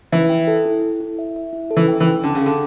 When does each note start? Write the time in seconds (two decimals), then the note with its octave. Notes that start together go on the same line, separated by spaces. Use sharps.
0.12 E3 E5
0.29 G5
0.48 A4
0.65 E4
0.82 E4
1.01 E4
1.19 E5
1.36 E5
1.53 E4
1.71 A4
1.77 E3
1.88 G5
2.00 E3
2.06 G5
2.23 D3 G5
2.35 C#3
2.42 D3 A4